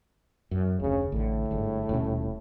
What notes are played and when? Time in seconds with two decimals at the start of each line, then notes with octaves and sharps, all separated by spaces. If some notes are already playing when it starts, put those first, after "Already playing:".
0.51 F#2
0.80 F1 D2 C#3
1.12 A1 A2 D3
1.51 G1 G#2 D3
1.89 D#1 B2 C#4